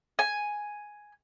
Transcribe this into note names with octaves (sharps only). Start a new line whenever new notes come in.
G#5